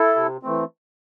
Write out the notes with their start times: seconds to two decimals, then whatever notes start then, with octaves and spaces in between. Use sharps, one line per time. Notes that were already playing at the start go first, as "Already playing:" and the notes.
Already playing: E4 A4
0.16 C3
0.43 E3 A3 C4